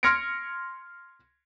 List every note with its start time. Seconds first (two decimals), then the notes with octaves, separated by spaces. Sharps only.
0.03 C6 F6 G#6 A#6 C#7 D7